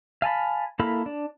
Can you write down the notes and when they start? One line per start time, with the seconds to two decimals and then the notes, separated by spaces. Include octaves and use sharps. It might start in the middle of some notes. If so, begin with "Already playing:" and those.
0.22 F5 G#5 A5 B5
0.79 A#3 E4 A4 F5 B5
1.06 D4